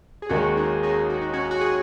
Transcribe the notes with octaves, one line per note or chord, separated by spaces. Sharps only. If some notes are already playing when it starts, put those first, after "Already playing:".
G#4
D#2 D#3 G#3 C#4 F#4
D#4 G#4
D#4 G#4
F#4
D#4
C#4 F#4
F#4
G#4